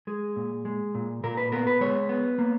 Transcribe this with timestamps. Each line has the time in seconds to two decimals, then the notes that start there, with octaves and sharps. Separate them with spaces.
0.07 G#3 G#4
0.36 A#2
0.65 G#3
0.95 A#2
1.23 A#2 A#4
1.37 B4
1.52 B3 A#4
1.67 B4
1.81 G#3 C#5
2.09 B3
2.39 A#3